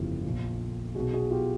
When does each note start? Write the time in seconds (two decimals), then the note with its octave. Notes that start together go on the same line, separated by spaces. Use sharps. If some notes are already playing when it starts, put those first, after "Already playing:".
Already playing: G1 F2 C#3 E3 F4 G4
0.24 A#1 A#2
0.95 B1 B2 F#4 G#4
1.13 F#4 G#4
1.30 F4 G4